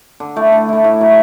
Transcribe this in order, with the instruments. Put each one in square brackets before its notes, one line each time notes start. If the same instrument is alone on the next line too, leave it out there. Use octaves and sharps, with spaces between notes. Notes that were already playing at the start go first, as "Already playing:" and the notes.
[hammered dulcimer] D3
A3 E4
D3
A3 E4
A2
F#3 A3 E4